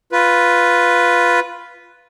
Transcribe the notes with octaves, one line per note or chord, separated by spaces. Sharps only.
F4 B4